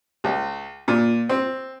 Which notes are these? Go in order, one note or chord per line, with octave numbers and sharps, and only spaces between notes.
C#2
A#2
C4